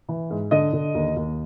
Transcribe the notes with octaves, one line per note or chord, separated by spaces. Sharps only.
E3
G#2
D3 D#5
D3
D#2
D#2